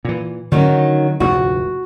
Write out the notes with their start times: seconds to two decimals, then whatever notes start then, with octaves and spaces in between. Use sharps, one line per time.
0.05 A#2 E3
0.52 D3 D#3 F#3 C#4 D#4
1.20 F1 D2 G#2 F#4